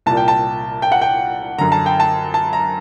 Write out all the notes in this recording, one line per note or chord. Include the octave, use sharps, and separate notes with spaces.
C2 A#2 A5
G5
A5
G5
F#5
G5
F#2 D3 A#5
A5
G5
A5
A5
A#5